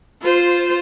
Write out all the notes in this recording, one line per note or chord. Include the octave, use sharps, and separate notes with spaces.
F4 C5